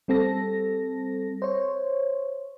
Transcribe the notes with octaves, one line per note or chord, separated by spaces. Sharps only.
G3 C4 A4 A#6
C5 C#5